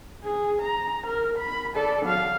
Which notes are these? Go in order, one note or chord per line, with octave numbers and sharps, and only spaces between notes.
G#4
A#5
A#4
B5
A4 D5
F#3 F5